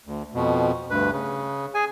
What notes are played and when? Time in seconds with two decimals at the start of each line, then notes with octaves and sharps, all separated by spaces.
0.05 D2
0.34 F2 B2
0.90 D2 G2 B4
1.12 C#3
1.75 G#4 G#5